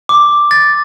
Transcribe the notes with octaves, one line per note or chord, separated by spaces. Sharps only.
D6
A6